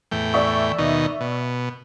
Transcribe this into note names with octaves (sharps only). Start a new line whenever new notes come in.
E2 A2 G5
D5 E5 C#6
D#2 B2 D#4
B2